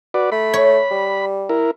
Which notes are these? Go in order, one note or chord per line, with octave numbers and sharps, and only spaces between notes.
F#4 B4 D5
A3 B5
C#5
G3
E4 A#4